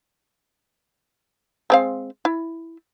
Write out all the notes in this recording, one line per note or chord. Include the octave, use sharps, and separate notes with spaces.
G#3 C4 F5
E4